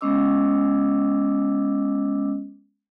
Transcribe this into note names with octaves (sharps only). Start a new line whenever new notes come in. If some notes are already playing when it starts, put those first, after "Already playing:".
G#3 B3 C#4 D#5 D6 E6